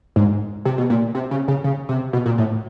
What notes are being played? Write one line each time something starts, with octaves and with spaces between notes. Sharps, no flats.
G#2
C3
B2
A#2
C3
C#3
C#3
C#3
C3
B2
A#2
A2